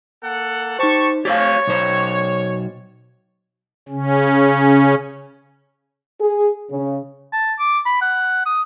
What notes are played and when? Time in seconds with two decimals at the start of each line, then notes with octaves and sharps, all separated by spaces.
0.24 A#3 A4 F#5
0.79 D#4 G4 C5 A5 C#6
1.25 G4 C5 C#5 F5 A6
1.67 B1 C5
3.89 C#3 C#4
6.21 G#4
6.71 C#3
7.33 A5
7.59 D6
7.86 B5
8.01 F#5
8.46 D#6